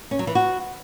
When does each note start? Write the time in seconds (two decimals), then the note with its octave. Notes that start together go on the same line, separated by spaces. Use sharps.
0.11 C#4
0.19 F#3
0.27 E3
0.35 F#4